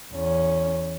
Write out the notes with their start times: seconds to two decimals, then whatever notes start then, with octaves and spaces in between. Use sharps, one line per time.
0.13 E2 C#4